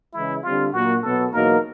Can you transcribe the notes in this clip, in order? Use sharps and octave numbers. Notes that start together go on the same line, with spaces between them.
C#3 E3 G#3 E4
D3 G3 C4 F4
A#2 F#3 A#3 F#4
B2 F#3 B3 A4
E2 B2 F#3 A#3 D#4 A#4